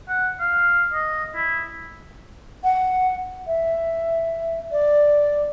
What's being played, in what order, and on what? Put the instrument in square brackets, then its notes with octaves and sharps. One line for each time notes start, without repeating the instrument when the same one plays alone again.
[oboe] F#5
F5
D#5
E4
[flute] F#5
E5
D5